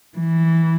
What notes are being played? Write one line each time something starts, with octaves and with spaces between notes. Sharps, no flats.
E3